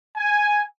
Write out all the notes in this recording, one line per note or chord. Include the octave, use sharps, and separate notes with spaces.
G#5